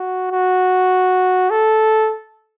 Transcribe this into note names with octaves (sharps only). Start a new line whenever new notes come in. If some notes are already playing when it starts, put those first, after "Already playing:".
Already playing: F#4
F#4
A4